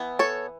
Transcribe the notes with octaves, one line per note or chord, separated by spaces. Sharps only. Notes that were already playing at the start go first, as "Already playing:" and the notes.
Already playing: E3 B3
A4 C#5